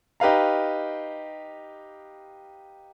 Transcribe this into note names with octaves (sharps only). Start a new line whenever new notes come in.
D#4 G4 B4 F5 A#5